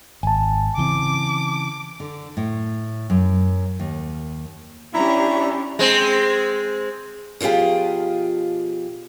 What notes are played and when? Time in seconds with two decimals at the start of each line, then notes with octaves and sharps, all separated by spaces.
0.23 G#1 G#5 A5
0.78 C#3 E3 C4 D6
2.00 D3
2.37 A2
3.10 F#2
3.80 D#2
4.94 C#4 D4 E4 G4 A#5
5.79 G#3 C4
7.41 B2 F3 F4 G4 G#4